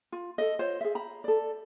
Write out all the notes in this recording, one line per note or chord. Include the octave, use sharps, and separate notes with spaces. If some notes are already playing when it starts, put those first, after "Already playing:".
F4
A4 D#5
F4 C5 C#5
G#4 E5
A#5 B5
A4 D5